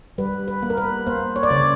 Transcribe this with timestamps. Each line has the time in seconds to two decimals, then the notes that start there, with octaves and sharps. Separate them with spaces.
0.18 G3 B4
0.48 B4
0.63 A#3
0.70 A#4
0.77 B4
1.07 A#3 C5
1.36 C#5
1.43 D5
1.51 C#3 C#5